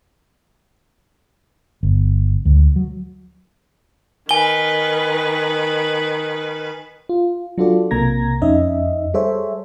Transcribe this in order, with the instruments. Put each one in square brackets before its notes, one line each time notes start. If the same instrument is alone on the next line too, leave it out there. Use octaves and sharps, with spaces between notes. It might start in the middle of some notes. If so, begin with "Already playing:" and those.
[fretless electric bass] G1
D2
F#3
[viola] D#3 B4 [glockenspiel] G#5 G7
[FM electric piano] F4
F#3 D4 F4 F#4 A4 D5
B1 C3 A#3 A#5 G#6 A#6
F2 C#4 D#4 D#5 E5
G3 G#4 A4 C5 C#5 E5